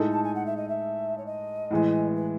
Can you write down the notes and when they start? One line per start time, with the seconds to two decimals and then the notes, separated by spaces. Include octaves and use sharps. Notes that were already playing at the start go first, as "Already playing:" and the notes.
Already playing: A2 G#3 D#4 A4
0.12 A5
0.23 G#5
0.35 F#5
0.46 E5
0.57 D#5
0.69 E5
1.18 C#5
1.26 D#5
1.71 A2 E3 G#3
2.16 B4